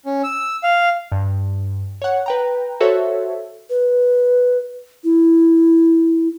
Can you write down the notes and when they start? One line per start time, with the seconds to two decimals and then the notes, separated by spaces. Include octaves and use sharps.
0.05 C#4
0.24 E6
0.63 F5
1.12 G2
2.02 C#5 F#5
2.26 B4 G5 A#5
2.81 F#4 A4 C5 C#5 E5
3.70 B4
5.04 E4